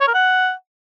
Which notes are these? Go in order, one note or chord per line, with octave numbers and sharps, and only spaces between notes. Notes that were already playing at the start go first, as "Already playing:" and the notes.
C#5
A#4
F#5